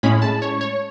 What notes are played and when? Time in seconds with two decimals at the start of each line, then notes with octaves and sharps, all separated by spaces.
0.03 A2 G#3 C#4 B5
0.22 A5
0.42 C#5
0.61 C#5